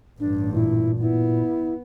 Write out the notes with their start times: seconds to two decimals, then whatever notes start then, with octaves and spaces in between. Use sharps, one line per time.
0.20 A1 G2 D4
0.54 A#2 E4
1.01 B3 E4